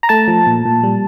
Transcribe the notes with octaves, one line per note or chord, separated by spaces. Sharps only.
A#5
A3 A5
F3
A#2
A#2
G3